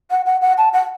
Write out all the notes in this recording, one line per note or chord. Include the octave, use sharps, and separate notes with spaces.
F#5
F#5
F#5
A5
F#5